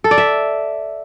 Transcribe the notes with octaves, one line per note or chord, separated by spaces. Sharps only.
A4
D5
E5